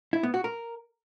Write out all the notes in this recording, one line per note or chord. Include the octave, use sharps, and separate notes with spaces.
E4
B3
F#4
A#4